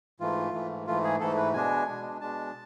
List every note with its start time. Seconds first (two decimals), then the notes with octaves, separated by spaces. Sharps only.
0.20 G#2 E3 A3 F4
0.53 G#2 E3 A3
0.87 G#2 E3 A3 F4
1.04 G#4
1.20 G#2 E3 A3 A4
1.37 B4
1.54 B2 G#3 D4 G#5
1.88 B2 G#3 D4
2.21 B2 G#3 D4 A5